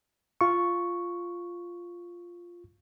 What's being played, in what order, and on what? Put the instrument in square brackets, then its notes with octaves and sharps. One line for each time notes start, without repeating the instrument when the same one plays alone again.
[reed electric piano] F4 C#6